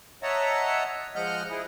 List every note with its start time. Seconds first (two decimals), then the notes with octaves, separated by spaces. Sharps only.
0.23 C#5 D#5 E5 F#5 A5 A#5
1.16 F3 G#3 D#5 F#5 F6 G6
1.50 E4 G#4